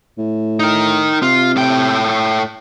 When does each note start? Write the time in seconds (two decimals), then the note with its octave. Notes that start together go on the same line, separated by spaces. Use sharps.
0.18 A2
0.60 D#4 A#4
1.22 C3 F4
1.56 A2 G5